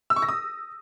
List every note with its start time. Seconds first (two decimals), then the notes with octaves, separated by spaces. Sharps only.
0.10 E6
0.16 C#6
0.22 A#6
0.28 D#6